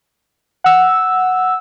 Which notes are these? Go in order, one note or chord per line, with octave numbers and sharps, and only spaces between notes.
F#5 E6